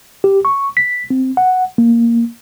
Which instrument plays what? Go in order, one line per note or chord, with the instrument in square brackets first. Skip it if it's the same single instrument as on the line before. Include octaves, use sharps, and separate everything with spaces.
[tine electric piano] G4
C#6
B6
C4
F#5
A#3